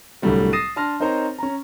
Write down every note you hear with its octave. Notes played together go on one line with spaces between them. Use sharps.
C2 A2 D3 F#3 G3 A3
D#6 A6 A#6 C7 D#7 E7
D4 A5 C6 F6 A#6
C4 D#4 A#4 C5 C#5 A#5
C#4 A#5